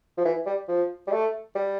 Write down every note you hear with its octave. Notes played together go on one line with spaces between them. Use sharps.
F3
E3
G3
F3
G3
A3
G3